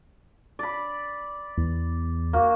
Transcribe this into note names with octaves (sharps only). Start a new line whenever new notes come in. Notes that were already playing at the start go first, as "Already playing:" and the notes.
D5 B5
E2
A#3 F#4